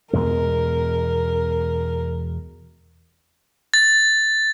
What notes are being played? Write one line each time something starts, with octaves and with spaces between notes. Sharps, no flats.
E2 B2 G#3 A#4
A6